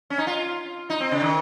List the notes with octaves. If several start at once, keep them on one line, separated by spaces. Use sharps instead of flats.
C#4
D#4
F4
D#4
C4
C#3
D#3